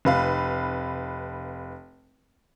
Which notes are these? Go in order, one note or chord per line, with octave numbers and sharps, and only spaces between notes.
F1 B4 F5